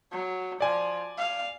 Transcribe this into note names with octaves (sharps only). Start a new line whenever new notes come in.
F#3
F3 D5 G#5
F5